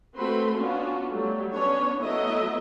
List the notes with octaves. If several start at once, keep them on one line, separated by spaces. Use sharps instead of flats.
A3 C4 F#4 B4 B5 C6
B3 C#4 D4 F4 F#4
F#3 G3 A3
B3 C#4 D4 C#5
F#3 A3 B3 E4 D#5 E5